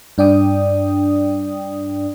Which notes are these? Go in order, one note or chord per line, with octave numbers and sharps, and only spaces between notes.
G2 D4 D5 G5 D#6